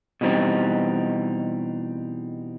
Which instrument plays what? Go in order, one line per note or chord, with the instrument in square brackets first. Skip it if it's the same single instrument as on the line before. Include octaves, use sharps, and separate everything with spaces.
[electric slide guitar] B2 E3 G3 C4 D#4